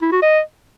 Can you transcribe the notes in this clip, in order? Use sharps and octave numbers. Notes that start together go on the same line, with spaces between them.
E4
F#4
D#5